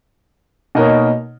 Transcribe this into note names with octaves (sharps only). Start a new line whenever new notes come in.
B2 A#3 D#4 A#4 C#5